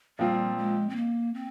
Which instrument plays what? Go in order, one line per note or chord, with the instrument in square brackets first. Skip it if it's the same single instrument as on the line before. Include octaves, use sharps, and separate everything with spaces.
[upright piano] A#2 F3 C4 F4 [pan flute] G3
[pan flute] G#3
C4
A#3
C4